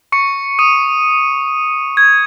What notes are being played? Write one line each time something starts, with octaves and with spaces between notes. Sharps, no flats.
C#6 C#7
D#6 D#7
G#6